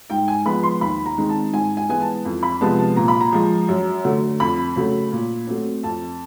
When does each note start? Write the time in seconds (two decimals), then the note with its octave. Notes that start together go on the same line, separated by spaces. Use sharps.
0.10 G#2 G5
0.28 G#5
0.45 F3 G#3 B3 B5
0.63 C6
0.81 D#2 B5
1.06 A#5
1.18 D#3 G#3 C4
1.29 A5
1.53 G#2 G#5
1.77 G#5
1.89 E3 G#3 B3 G#5
2.02 A5
2.25 F2
2.43 B5
2.61 C3 F3 G#3 B3 A5
2.78 A5
2.96 A#2 A#5
3.08 B5
3.21 A#5
3.32 F3 G#3
3.68 F#2
4.04 D3 F#3 A3
4.40 F2 B5
4.76 C#3 F#3 A3
5.12 A#2
5.47 F#3 A3 C4
5.83 F2 A5